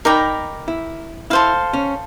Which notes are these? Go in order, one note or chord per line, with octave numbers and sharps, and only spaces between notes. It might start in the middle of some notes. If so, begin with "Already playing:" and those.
D#4 A#4 D5 G5 B5
E4
E4 A4 C5 F5
C#4